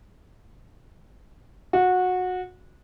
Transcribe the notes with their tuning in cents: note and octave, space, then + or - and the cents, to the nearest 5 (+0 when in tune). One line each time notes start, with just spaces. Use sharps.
F#4 -20